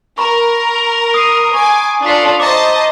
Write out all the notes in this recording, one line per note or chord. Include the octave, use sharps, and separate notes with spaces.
A#4 A#5 B5 C#6
D#6 C7 D#7
G#5 C#6 D6
D4 F4 A4 D6 B6
C5 D#5 A5 A#5 C#6 D6